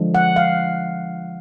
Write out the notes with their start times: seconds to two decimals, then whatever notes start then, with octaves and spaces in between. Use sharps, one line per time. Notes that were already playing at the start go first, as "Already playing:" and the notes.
Already playing: D3 F3 G#3
0.15 F#5
0.36 F5